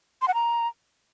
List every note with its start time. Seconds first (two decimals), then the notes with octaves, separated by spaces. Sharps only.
0.22 C6
0.28 F#5
0.34 A#5